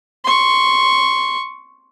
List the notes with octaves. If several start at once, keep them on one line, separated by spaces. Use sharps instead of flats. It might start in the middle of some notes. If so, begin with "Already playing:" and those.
C6 C#6